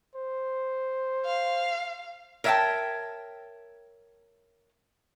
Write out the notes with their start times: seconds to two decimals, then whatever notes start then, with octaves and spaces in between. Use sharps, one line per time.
0.15 C5
1.25 F5
2.44 A#4 C#5 E5 F5 G5 A5